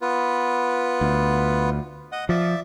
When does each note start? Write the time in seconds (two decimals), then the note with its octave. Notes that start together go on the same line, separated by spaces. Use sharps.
0.02 B3 F4 B4
1.01 D2
2.12 D#5 F#5
2.29 F3 D5 E5